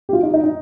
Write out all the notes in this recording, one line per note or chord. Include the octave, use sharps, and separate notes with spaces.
G4
F4
D#4
D#4
D#4